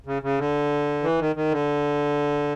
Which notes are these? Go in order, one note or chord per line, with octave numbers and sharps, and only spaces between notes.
C#3
C#3
D3
E3
D#3
D#3
D3